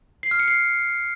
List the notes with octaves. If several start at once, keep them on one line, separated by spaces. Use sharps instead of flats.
C7
F6
C#7
C7